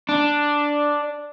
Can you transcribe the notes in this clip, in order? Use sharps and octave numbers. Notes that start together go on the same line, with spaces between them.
D4